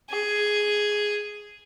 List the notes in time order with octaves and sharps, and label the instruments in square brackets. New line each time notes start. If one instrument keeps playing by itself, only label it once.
[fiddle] G#4